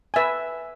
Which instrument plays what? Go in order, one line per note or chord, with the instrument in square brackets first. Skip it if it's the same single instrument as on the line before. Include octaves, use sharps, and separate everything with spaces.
[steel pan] B4 E5 G#5